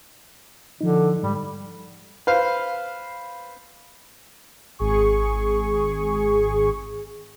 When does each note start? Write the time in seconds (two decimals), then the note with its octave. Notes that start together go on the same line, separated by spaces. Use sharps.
0.81 D3 F3 D#4
1.23 G#2 G3
2.27 B4 C5 F5
4.79 G#1 G#4 C#6